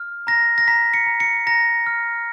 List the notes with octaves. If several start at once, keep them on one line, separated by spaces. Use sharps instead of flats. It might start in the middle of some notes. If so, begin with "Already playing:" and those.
Already playing: F6
A#5 A#6
A#6
A#5 B6
C#7
A#5
C#7
A#5 A#6
F6